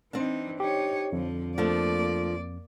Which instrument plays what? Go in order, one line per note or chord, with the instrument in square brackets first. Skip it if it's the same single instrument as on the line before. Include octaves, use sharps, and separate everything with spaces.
[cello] E3 D#4 [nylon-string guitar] C4 D4
[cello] D#4 C#5 [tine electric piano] G4
[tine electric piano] F2 [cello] D3 F3
[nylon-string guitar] F3 A3 D4 [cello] A#3 D5